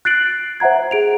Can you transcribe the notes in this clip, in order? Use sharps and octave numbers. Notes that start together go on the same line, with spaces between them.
F#6 A6 C7 D7 F#7
C5 E5 F#5 A#5 G#6
G#4 D7 F7